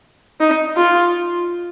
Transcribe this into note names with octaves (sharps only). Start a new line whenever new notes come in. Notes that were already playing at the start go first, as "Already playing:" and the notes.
D#4
F4